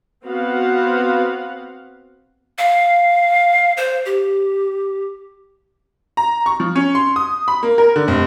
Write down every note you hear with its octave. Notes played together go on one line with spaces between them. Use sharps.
B3 C4 F#4 F5 F#5
F5
C5
G4
A#5
C#6
F3
C#4
C6
D#6
B5
A#3
A#4
D3
F1